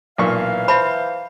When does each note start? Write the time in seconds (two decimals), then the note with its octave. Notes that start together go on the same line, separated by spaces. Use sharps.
0.18 B1 A#2 E3 F5 C#6
0.68 C5 E5 A5 B5